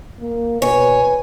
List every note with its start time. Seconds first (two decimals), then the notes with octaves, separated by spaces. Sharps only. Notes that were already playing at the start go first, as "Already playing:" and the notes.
0.21 A#3
0.62 B2 B4 C#5 G#5